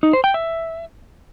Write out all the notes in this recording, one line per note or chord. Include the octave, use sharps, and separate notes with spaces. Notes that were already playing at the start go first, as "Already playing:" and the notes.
D#4
C5
G5
E5